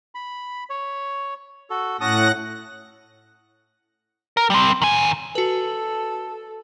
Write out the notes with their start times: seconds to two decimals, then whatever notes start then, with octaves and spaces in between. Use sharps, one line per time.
0.15 B5
0.70 C#5
1.70 F#4 A4
2.01 A2 C#4 F#5 A5 D#6 A#6
4.37 A#4
4.50 G3 C4
4.82 D#3 G#5
5.35 F#4 A4 B4